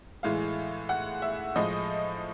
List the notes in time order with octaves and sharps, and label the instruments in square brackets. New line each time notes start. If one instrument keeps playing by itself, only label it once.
[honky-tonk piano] A2 E3 G#3 F5
F#5
E5
A2 F3 G#3 D#5